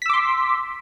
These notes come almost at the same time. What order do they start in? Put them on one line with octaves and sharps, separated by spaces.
B6 E6 D6 C6